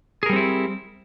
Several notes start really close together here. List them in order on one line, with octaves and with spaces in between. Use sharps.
G#4 A#4 G3 C4 E4